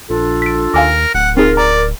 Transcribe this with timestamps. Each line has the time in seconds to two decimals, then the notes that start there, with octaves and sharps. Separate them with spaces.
0.10 A#1 D4 F4 A4
0.42 B6 D7
0.74 D#2 A#4 F5 G#5 D6
1.15 D1 F#5
1.37 C4 D#4 F4 G#4 A#4
1.57 D5 A#5